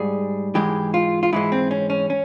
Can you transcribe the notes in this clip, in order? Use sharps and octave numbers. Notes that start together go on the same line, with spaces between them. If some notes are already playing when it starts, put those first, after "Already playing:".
Already playing: G#2 G3 G#4
G#2 E3 G#3 G4
F4
F4
G#2 E3 G#3 E4
C4
C#4
C#4
C#4